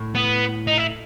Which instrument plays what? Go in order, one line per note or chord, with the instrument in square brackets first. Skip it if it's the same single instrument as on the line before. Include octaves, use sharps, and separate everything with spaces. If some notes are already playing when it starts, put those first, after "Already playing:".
Already playing: [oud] A2
[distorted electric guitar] B3
D#4
E4